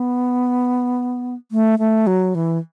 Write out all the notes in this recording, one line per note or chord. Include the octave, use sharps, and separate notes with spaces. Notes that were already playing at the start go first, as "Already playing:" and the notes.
Already playing: B3
A3
A3
F#3
E3